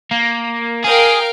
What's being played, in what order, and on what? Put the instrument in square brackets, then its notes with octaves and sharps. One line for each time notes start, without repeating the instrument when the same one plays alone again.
[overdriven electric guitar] A#3
[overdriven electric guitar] G#4 [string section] A#4 F5 G5